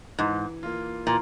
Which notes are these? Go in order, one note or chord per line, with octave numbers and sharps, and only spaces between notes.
G#2 E3
A#3 F4
A#2 E3